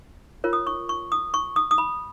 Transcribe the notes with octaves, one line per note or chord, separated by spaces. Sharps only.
F4 A#4 C#5
D#6
C#6
C#6
D#6
C#6
D#6
D#6
B5